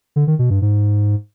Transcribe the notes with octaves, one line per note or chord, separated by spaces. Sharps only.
D3
D#3
B2
G2
G#2